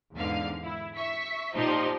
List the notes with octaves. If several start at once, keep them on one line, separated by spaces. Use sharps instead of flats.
E2 G#2 D3 F5
E4
E5 C#6 B6
A#2 F3 D#4 G4 D#5 C6